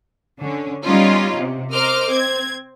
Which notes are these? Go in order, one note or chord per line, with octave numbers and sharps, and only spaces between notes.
D3 C#4
G3 B3 C#4 D#4 F4
C3
A#4 C5 D#5 D6 F6
C4 G#6